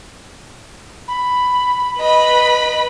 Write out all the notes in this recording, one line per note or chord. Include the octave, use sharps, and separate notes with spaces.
B5
B4 D#5 B5